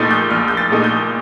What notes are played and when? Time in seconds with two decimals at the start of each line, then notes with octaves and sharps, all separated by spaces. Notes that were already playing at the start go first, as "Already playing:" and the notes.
Already playing: A#1 A#2 A3 D#4 G6 A6
0.11 G6
0.31 A#1 F6
0.48 G6
0.57 A6
0.71 A#2 A3 D#4
0.84 G6